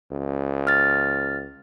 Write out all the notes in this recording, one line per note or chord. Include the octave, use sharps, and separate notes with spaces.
C#2
F6 A6